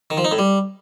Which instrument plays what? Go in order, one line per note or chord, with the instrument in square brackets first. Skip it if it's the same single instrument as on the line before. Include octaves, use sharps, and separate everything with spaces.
[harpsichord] D#3
F3
D#4
A2
G3